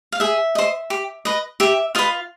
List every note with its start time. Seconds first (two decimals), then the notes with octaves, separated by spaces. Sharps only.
0.12 F5
0.20 G#4 E5
0.55 C5 D#5
0.90 G4
1.25 B4 D#5
1.60 G4 E5
1.95 F4 B4 D#5 F5